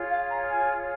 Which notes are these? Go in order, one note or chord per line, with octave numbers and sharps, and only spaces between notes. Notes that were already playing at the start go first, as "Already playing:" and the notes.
Already playing: F4 G#4 C#5
F5
A#5
G#5